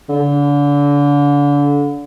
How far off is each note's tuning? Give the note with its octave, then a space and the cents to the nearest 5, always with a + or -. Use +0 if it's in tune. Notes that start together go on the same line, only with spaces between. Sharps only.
D3 -35